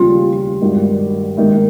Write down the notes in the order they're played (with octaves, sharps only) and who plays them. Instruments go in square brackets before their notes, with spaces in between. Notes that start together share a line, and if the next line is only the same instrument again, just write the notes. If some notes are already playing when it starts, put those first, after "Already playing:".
Already playing: [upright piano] F1 D#2 C#3 G3 C#4 [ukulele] F4
[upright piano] G#1 G2 D#3
G#2 D#3 A#3